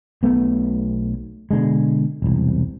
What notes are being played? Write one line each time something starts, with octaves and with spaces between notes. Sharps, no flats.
B1 B2 A3 B3
B2 D3 G#3
E1 C2